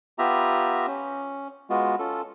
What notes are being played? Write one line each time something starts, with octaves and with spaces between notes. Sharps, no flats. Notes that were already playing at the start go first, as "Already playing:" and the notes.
B3 F4 G4 E5 A#5
C#4
G#3 B3 F4 F#4
C#4 F4 A4